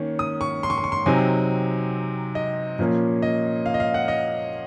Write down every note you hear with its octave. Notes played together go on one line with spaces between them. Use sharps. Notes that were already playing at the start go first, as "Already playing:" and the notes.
Already playing: D#3 A#3 C#4
D#6
C#6
C6
C#6
C6
C#6
C6
C3 F#3 C4 D#4 G#5
D#5
A#2 F3 A#3 C#4
D#5
F5
D#5
F5
F#5
D#5